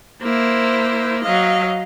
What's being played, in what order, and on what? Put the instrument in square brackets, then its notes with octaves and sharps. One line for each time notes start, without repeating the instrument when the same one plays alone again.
[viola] A#3 E4 [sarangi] C5
[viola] F#3 D#5 [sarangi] F5